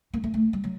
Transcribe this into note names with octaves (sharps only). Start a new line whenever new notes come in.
A#3
A3
A3
G3
F#3